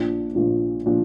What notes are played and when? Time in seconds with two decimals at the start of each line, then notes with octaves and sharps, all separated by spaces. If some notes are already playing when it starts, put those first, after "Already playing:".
Already playing: A#1 A#2 F3 D4
0.35 A#1 A#2 F3 D4
0.86 A#2 F3 D4